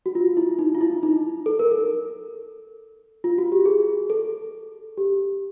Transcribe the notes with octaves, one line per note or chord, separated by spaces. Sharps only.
F#4
F4
E4
D#4
F4
E4
D#4
A4
A#4
A4
F4
F#4
G4
G#4
A4
G4